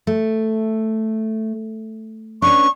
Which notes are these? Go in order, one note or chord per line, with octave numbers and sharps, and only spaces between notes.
A3
B3 C#4 D4 C#6